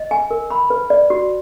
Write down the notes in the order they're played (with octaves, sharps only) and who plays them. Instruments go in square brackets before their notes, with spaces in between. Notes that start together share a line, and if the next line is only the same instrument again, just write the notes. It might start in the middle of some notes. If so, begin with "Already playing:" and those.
Already playing: [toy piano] D#5
G#5
A#4
B5
B4
D5
F#4